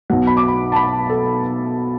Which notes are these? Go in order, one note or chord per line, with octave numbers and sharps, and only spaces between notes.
B1 B2 F#3 F#5
B5
D6
B5
A5
B5
A4